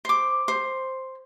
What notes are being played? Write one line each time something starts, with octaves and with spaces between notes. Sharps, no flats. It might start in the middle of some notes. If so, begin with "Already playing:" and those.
C5 D6
C5